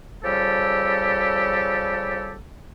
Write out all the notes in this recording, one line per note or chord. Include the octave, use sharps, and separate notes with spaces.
C#3 F3 G3 G4 A4